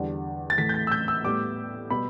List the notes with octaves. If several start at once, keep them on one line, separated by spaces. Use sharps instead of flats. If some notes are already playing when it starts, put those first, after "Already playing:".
Already playing: E2 D3 G3
A6
A2 E3 A3 B6
G6
A6
E6
G6
E6
A2 G3 B3 D6
B2 G3 B3 B5